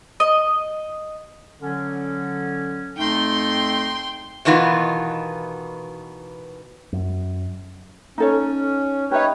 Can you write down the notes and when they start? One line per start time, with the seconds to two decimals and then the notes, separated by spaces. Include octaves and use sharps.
0.20 D#5
1.62 D3 F#3 C#4
2.97 F2 A3 D#4 G5 C6
4.45 B2 D#3 E3 B3 F4
6.93 F#2
8.18 C#4 D#4 A4 C#5
9.11 D#4 G4 B4 C#5 E5